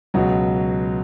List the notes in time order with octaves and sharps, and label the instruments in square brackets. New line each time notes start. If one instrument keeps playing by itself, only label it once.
[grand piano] C#2 B2 F#3